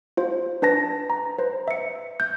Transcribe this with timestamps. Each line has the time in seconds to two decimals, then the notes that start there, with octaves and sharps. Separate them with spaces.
0.17 F4 C5
0.62 D4 B4 A5 A#6
1.10 A#5
1.38 B4 C5
1.68 E5 C#7
2.20 G6